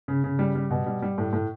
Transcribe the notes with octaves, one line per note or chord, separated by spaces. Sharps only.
C#3
C#3
G3
G3
B2
G3
G3
A2
A2